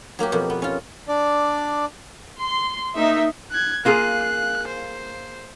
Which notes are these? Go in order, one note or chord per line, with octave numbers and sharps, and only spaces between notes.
F#3 A#3 F#4 G4
F2 B2 A#3
B3
C#4 F4
D4 D5
C6
A#3 D#4 E5
F#6 G#6
A#3 F4 G#4 F#6
C5